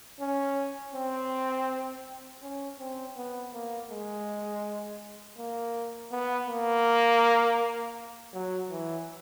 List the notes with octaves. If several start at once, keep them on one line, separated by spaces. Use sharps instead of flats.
C#4
C4
C#4
C4
B3
A#3
G#3
A#3
B3
A#3
F#3
E3